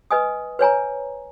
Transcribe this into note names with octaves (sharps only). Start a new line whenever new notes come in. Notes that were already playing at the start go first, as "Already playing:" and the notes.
B4 D#5 G#5 D#6
B4 C#5 G#5 A#5